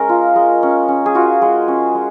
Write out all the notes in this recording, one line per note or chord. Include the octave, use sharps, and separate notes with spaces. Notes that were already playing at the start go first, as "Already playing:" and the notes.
Already playing: G#3 C#4 A#4 D#5
F4
G#3
C#4
C#4
G#4
F4 F#4
G#3
C#4
G#3